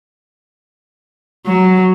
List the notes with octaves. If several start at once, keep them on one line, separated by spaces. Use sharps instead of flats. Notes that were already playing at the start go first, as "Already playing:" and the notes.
F#3